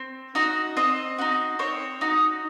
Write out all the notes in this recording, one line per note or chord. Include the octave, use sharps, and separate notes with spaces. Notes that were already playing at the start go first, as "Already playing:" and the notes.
Already playing: C4
D#4 F#4
C4 D#5
D#4 F#4
C4 C#5
D#4 F#4